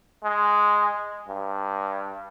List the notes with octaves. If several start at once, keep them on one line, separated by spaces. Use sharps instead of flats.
G#3
G2